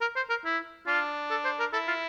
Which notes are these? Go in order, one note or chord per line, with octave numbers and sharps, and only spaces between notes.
A#4
C5
A#4
E4
D4 F4
A4
C5
A#4
E4 A4
F4